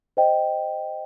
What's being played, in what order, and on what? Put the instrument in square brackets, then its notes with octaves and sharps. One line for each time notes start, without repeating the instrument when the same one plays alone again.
[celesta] C5 D#5 G5